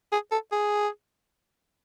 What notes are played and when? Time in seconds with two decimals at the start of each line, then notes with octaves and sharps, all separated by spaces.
0.12 G#4
0.31 A4
0.52 G#4